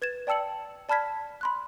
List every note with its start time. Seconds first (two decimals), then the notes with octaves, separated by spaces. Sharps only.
0.02 B4 G#6 A6 E7
0.27 D5 G5 A5 E6 C#7 F#7
0.89 D5 A5 B5 F6 G#6 B6
1.41 B5 C6 F#6